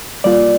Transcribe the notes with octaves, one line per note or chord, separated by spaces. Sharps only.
G3 A#3 F4 D5